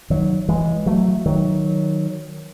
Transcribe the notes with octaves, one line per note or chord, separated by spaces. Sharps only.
D#3 F#3
E3 G#3
F#3 A3
D#3 F#3